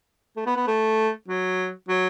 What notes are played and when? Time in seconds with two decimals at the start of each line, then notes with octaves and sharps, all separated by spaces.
0.36 A3
0.46 B3
0.56 B3
0.67 A3
1.28 F#3
1.88 F#3